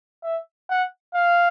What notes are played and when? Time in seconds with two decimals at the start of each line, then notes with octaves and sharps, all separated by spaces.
0.23 E5
0.70 F#5
1.14 F5